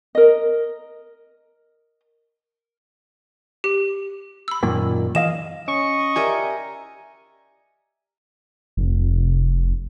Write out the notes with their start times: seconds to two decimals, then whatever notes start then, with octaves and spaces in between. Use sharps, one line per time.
0.15 A#4 D#5
3.64 G4
4.48 B5 E6
4.63 F#2 A#2 D#3
5.15 E3 D#5 F5 E7
5.68 C#4 D#5 C#6
6.16 G4 A#4 D5 E5 G#5
8.77 F1